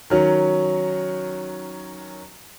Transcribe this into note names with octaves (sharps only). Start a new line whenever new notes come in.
D#3 F#3 C#4